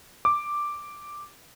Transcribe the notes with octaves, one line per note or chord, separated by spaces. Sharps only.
D6